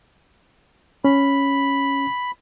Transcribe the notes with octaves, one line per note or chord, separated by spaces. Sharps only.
C#4 B5